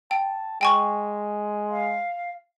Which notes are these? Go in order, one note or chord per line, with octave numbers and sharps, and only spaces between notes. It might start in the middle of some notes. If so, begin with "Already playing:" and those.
G5 A5
G#3 G5 G#5 C#6
F5